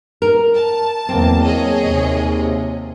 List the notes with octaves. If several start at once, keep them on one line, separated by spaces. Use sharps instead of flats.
A#4
A5
E2 F#3 A#3 C4
G#4 C#5 D#5
D#2 C3